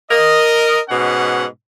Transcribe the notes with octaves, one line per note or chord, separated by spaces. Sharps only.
A#4 D#5
G#2 B2 C#4 F#5